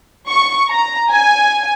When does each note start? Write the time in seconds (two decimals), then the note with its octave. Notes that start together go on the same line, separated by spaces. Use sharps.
0.28 C#6
0.69 A#5
1.11 G#5